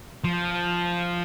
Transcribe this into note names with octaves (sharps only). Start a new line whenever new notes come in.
F3